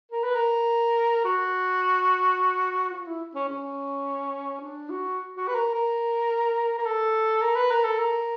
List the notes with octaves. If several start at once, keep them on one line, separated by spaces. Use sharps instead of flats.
A#4
B4
A#4
F#4
F4
E4
C#4
C#4
D4
F#4
F#4
B4
A#4
A#4
A#4
A4
A#4
B4
A#4
A4
A#4